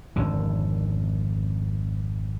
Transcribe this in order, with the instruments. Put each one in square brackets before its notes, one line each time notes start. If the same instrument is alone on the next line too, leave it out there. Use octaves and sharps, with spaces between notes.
[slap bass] G#1 F2 D3